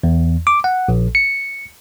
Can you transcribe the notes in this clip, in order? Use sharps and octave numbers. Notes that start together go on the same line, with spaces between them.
E2
D6
F#5
A#1
C#7